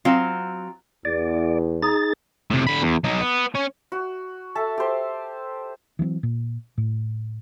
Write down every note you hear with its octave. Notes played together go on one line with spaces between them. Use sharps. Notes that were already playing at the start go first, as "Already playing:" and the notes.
F#3 C4 F4
E2 D5
D#4 G#4 A6
A2 C3
D3 B5
E2
F#3 D#4
B3
C#4
F#4
A4 E5 A5
G4 C5
E3 F#3 A#3 C4
A#2
A2